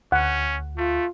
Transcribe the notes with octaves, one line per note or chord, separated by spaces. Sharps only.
D2 C#4 F#5
A3 F4